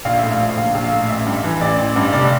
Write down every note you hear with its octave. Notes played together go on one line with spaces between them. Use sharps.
A#1 F5
E5
A2
F5
F3
A#1 F5
A#1
F5
A2
A1 E5
G2
E3
A1 D5
A1
G2
F1 D5